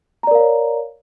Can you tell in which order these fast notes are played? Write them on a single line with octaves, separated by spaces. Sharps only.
A#5 D5 A#4 F5 C#5